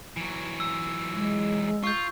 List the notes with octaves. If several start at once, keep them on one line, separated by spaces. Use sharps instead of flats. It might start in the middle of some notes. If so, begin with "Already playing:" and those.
E3 F#3
E6
G#3
F4 C#6 G6